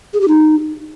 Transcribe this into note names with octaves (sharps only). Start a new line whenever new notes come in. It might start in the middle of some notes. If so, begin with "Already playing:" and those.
G#4
G4
D#4